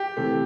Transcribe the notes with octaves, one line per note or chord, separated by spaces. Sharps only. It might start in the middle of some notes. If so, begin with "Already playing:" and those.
Already playing: G4
C3 E3 A3 C4